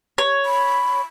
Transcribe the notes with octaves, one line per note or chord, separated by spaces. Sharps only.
C#5
B5